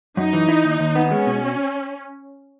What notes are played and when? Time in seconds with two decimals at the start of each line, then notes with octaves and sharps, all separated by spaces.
0.17 F#2 D#4
0.33 E3
0.49 E4
0.65 D#2
0.80 D#2
0.95 B3
1.11 G#3 C#4
1.27 B2